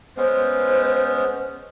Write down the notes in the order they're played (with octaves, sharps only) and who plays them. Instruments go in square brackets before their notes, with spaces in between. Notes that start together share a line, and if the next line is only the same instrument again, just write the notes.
[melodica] G#3 B3 C#4 [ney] C5